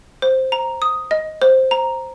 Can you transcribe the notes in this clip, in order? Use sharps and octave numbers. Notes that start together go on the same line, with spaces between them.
C5
A#5
D#6
D#5
C5
A#5